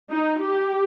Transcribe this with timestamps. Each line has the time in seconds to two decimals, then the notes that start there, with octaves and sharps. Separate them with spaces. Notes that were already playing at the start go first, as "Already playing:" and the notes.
0.11 D#4
0.41 G4